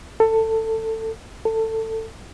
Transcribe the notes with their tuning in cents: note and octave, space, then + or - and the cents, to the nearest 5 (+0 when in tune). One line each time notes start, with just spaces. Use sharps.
A4 +20
A4 +20